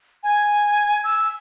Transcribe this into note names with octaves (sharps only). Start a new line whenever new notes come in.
G#5
E6